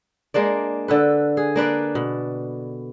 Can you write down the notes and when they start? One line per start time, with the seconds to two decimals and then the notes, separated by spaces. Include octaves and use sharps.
0.34 G#3 A#3 D4 D5
0.88 D3 A4 B4
1.37 G#4
1.56 A#3 D4 B4 D5
1.95 B2